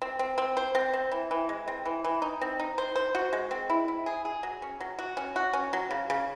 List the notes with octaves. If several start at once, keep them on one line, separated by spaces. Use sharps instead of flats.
C4
C4
C4
C5
C4
C4
E3
E3
G#3
C4
E3
E3
D#4
C4
D#4
C5
C5
F#4
G#3
C4
E4
E4
G#4
G#4
F#3
C#4
F#3
F#4
C#4
F#4
C#4
F#3
C#3
C#3